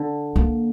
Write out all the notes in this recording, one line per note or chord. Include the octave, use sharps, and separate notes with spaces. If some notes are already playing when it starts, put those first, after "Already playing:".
Already playing: D3
A#3